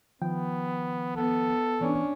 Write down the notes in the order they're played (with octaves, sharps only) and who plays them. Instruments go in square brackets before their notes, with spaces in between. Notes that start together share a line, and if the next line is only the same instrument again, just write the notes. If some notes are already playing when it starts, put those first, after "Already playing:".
[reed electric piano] D#3 F3 G5 [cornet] B3
[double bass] B3 [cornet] A4
[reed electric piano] E3 B3 [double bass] C#4 D4